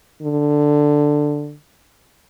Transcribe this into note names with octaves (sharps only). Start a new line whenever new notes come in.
D3